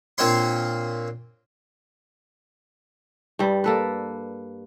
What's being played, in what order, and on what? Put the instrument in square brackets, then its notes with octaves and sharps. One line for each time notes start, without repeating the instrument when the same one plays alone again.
[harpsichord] A#2 C4 D4 F4 C#5 C6
[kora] G2 G3
A#3 A4 B4